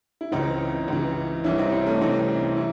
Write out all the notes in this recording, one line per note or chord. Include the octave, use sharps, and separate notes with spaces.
E4
C#2 C#3 E3 C4 D#4
C#2 C#3 E3
C2 C3 E3 C#4 E4
C4 D#4
C4 D#4
A3 C#4
C2 C3 E3 C4 D#4
E4